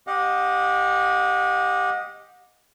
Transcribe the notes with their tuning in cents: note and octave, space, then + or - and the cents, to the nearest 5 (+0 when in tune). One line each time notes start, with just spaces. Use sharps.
G4 +0 D#5 +0 F#5 -35